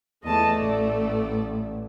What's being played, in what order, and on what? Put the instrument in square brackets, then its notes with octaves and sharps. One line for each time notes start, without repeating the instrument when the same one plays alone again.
[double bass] E2 [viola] A3 [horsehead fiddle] D#5 A5
[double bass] A1 [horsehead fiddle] D5